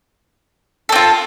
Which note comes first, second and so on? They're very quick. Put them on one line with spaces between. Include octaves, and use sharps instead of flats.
A4 C4 F4